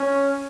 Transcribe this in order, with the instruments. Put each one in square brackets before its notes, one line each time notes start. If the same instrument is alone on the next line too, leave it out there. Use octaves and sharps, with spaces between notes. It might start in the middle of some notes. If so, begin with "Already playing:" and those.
Already playing: [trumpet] C#4